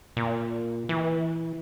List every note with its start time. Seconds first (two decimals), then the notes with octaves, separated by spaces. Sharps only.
0.17 A#2
0.89 E3